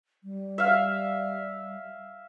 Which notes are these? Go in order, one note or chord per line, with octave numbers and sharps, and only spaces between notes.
G3
E5 F5